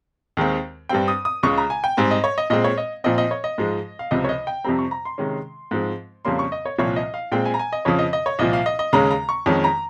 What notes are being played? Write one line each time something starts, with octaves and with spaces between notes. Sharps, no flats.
D#2 D#3 G#3 C4
G2 G3 C4 G5
D#6
D#6
C#2 C#3 G#3 C#6
A#5
G#5
G5
G#2 G3 C4 G#5
D#5
C#5
D#5
A#2 G#3 C4 D#5
C#5
D#5
A#2 F3 C4 D#5
D#5
C#5
D#5
G#2 F3 G#3
F5
C#2 C3 F3 C4 D#5
C#5
D#5
G5
F2 C3 G3 C4 A#5
C#6
A#5
C6
C3 D#3 G#3 C#4
G#2 F3 G#3 C4
F2 C#3 G3 A#3 C#4 C6
C#6
D#5
C#5
C2 A#2 F3 C4 C#5
D#5
F5
A#2 G#3 C4 G5
G#5
A#5
G#5
D#5
F2 C#3 F3 C#5
D#5
D#5
C#5
C2 A#2 F3 D#5
F5
D#5
D#5
D#2 C#3 G#3 C#4 A#5
A#5
C#6
F2 D#3 G#3 C#4
A#5